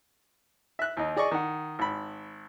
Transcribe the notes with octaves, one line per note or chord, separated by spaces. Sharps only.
E5 F#6
D#2 D#4
G#4 D5 D#5 C#6
D#3 F#5
G#1 B5